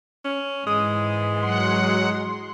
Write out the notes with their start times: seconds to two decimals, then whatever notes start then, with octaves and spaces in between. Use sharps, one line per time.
0.25 C#4
0.66 G#2 E3 G#3 D#6
1.42 F#3 F#5 C6